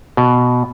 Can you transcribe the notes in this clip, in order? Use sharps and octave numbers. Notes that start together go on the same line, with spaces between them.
B2